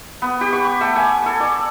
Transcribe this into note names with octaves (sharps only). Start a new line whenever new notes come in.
B3
G4
C#6
A3
G#5
A4
D5